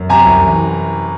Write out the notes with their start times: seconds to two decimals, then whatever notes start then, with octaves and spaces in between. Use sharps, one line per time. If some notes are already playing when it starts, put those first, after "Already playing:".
Already playing: F#2
0.09 C3 G#5 A#5
0.26 C2
0.43 E3